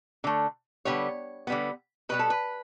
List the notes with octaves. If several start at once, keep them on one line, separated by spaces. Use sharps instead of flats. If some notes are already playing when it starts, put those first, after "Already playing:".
D3 A3
D3 G3 B3 C#5
D3 G3 B3
B2 G3 B3 B4
A4
B4